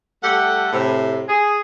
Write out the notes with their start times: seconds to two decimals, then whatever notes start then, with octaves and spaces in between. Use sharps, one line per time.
0.24 G3 A3 G4 A4 F#5
0.73 A2 C3
1.29 G#4